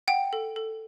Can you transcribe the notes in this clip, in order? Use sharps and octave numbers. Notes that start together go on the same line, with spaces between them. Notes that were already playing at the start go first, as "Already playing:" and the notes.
F#5 G5
A4
A4